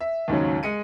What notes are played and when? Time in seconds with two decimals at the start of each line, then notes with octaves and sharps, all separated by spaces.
0.01 E5
0.28 D#2 G#2 C#3 F#3
0.63 G#3 C#7 D#7